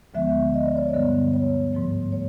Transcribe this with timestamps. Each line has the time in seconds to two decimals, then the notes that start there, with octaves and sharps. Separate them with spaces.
0.14 D2 D3 F3 G#3 B3 E5
0.54 D#5
0.66 D5
0.77 C#5
0.89 D5
0.94 G2 D3 G3 B3
1.33 C#5
1.73 G#2 F3 A3
2.12 C#5